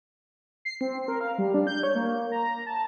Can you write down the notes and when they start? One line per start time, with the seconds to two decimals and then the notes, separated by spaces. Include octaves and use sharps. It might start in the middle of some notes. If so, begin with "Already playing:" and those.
0.65 C7
0.81 C4
1.08 A#4
1.21 F5
1.38 G3
1.54 D4
1.67 G6
1.83 C#5
1.95 A#3
2.32 A#5
2.66 A5